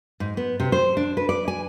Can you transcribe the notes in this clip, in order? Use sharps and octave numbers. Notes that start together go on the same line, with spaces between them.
G#2
B3
C3
C5
D4
B4
D5
G#5